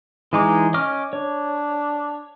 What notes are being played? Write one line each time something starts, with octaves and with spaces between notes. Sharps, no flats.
E3 G#3 D#4 D6
C#4 D#5 D6 F6
D4 C#5